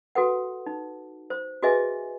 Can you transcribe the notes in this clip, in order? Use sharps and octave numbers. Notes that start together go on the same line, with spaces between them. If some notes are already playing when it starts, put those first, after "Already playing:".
F#4 A4 B4 F#5
D#4
C5
F#4 G#4 B4 D#5 E5 G#5